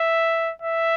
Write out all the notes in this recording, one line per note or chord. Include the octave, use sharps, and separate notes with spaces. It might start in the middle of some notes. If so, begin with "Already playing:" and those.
Already playing: E5
E5